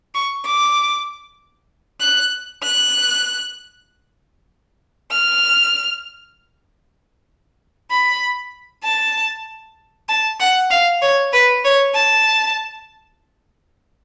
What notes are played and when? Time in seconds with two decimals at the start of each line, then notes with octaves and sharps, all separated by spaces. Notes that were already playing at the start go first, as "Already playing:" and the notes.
0.14 C#6
0.45 D6
2.01 F#6
2.63 F#6
5.11 F6
7.91 B5
8.84 A5
10.09 A5
10.40 F#5
10.71 F5
11.02 C#5
11.33 B4
11.64 C#5
11.94 A5